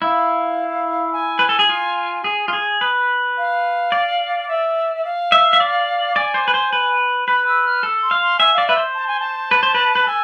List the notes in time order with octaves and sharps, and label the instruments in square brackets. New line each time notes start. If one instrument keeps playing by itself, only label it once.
[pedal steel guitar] E4 [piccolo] F5
[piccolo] G#5
[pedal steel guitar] B4
A4
G#4
F4
G#4
F4
G#4
B4
[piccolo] F5
[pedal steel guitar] D5
[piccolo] E5
E5
F5
[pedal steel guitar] E5
E5
D5
[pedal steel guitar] D5 [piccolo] G#5
[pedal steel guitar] C5
B4
C5
B4
[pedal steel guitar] B4 [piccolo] B5
[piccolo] E6
F6
[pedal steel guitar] A4
[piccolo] C6
[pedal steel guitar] F5
[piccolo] C6
[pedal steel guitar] E5 [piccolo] G#5
[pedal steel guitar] D5 [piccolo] F5
[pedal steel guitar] B4 [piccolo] E5
[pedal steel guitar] C5
[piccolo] A5
G#5
A5
[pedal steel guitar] B4
C5
B4
B4
[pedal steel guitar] A4 [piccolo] G#5